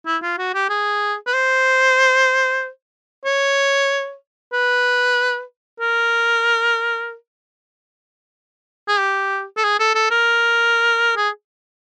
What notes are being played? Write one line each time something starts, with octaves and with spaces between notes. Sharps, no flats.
E4
F4
F#4
G4
G#4
B4
C5
C#5
B4
A#4
G#4
G4
A4
G#4
A4
A4
A#4
G#4